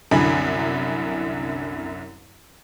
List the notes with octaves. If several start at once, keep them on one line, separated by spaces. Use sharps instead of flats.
C2 F#2 D3 E4 G#5 B5